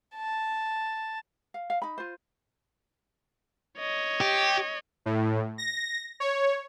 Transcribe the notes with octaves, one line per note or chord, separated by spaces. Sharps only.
A5
F5
F5
D#4 B5
F4 C5
C#5 D#5
G4
A2
A#6
C#5